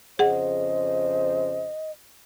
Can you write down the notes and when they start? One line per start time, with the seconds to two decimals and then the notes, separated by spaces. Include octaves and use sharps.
0.19 F2 C#3 G#4 C5 D#5 F#5